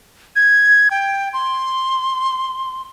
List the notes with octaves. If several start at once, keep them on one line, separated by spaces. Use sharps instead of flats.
G#6
G5
C6